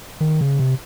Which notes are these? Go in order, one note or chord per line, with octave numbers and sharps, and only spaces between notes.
D#3
C#3
C3